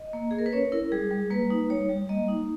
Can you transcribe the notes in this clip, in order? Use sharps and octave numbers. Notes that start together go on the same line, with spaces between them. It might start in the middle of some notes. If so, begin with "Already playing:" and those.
Already playing: D#5
A#3
A#3 G#4
A#4
B4
C#4 C#5
E4 A#4
G3 G#4
G3
A#3 B4
D#4
G3 C#5
G3
A#3 D#5
D#4